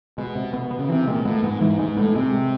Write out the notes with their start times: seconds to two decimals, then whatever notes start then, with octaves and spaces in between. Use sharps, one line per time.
0.18 B2 G#3
0.35 C3
0.53 B2 B3
0.71 B3
0.79 C#3
0.89 C3 E3
1.07 A#2 G#3
1.25 A2 B3
1.43 G#2 B3
1.61 G#2 E3
1.79 G#2 G#3
1.97 A2 B3
2.15 C3 G#3
2.33 G#3